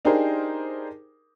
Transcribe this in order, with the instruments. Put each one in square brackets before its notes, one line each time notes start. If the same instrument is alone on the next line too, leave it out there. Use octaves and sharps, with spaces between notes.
[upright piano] D4 D#4 G4 G#4 A#4 C5